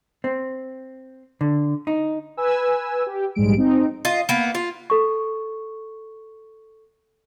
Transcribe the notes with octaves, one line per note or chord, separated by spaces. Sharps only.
C4
D3
D#4
B4 G#5 E6
G4
A#1 G#2 G3 G#3 D7
C4 D#4
F4 D#5
A#3 B3
F4
A4 C#6